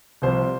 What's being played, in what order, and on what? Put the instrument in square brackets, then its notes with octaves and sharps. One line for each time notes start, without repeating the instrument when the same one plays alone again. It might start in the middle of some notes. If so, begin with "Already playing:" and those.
[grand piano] C2 C3 F3 C5